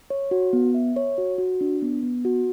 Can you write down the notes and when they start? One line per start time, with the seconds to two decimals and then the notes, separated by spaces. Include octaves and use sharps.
0.10 C#5
0.31 F#4
0.53 B3
0.74 E5
0.96 C#5
1.18 F#4
1.38 F#4
1.61 D4
1.82 B3
2.03 B3
2.25 F#4